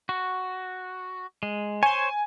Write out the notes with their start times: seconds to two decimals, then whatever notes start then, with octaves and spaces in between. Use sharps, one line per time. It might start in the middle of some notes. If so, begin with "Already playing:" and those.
0.09 F#4
1.43 G#3
1.83 C5 C#5 G#5